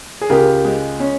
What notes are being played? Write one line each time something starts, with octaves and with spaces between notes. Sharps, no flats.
G#4
C#2 G4 A#4
G#3
C#4